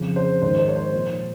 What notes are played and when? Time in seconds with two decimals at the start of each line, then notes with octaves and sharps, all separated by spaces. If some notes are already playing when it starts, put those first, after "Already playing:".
Already playing: F2 C#3 F3
0.16 C5
0.42 G#2 D#3 C5
0.59 C5
0.68 C#5
0.76 C5
0.93 A#2 F3